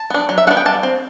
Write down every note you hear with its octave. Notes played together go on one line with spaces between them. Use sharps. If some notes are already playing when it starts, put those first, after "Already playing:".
Already playing: A5
B3 D4
F#3
E5
B3 D4 F#5
G5
G3 A5
C4